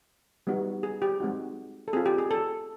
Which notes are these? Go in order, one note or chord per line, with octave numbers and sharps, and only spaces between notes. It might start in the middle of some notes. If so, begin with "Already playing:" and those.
G3 B3 D#4 F#4
G#4
G4
G#3 C4 D#4 F#4
A4
C4 F4 G#4
G4
G#4
A4